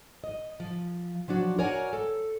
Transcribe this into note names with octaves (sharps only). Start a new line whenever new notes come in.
D#5
F3
F3 F#3 D4 F#4
F#4 A#4 C#5 D5 F#5 G#5
A4